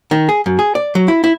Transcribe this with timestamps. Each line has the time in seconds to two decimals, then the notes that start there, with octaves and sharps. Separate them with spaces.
0.11 D#3
0.29 G#4
0.46 F#2
0.59 G#4
0.75 D5
0.95 F#3
1.08 E4
1.24 E4